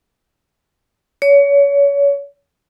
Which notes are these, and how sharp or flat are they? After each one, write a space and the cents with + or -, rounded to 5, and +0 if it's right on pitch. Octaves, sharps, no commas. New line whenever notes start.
C#5 +30